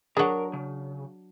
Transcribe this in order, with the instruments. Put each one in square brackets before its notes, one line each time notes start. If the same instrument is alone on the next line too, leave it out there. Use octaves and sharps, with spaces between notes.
[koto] F#3 D4 [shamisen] G#4 F#5 [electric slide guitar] A#4
[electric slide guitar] C#3